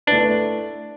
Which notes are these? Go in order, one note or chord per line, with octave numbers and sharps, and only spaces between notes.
A3 D4 E4 B4